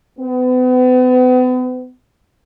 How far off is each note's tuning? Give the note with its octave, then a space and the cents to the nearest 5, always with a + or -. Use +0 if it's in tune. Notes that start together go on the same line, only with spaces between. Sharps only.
B3 +40